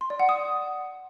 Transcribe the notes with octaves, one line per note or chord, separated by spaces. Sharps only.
C6
D5
F#5
D#6